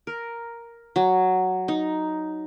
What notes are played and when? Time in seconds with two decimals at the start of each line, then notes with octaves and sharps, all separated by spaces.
0.07 A#4
0.96 F#3
1.68 D#4